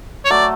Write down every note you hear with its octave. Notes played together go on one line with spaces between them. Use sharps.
C#5
F#3 A3 D5